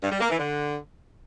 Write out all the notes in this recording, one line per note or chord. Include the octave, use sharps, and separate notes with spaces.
G2
G3
A#3
E3
D3